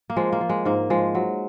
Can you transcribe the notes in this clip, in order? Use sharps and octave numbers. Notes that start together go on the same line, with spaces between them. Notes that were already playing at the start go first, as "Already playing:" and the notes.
A#3
F3 G#3
A#3
F3
G#3
G#2 A#3
F3 G#3
F#3